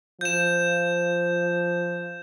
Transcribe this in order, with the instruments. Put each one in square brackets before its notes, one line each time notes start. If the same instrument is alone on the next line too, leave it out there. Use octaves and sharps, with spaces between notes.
[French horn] F3 [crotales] G6 E7